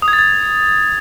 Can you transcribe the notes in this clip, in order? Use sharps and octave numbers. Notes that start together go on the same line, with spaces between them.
D#6
G#6
A6
G#6